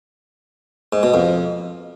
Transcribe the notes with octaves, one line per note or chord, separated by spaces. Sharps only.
G#2
B2
F2